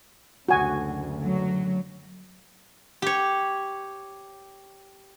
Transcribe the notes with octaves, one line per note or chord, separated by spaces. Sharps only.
F#1 D2 D3 F#4 G#5
F#3
G4 C#5